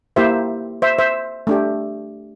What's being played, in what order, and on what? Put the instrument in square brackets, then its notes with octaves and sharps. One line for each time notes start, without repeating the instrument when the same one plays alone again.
[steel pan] A#3 E4 G4 C5 E5
C5 E5
C5 E5
A3 D4 G4